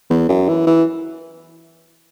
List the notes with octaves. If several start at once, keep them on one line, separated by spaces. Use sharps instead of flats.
E2
F#2
E3
E3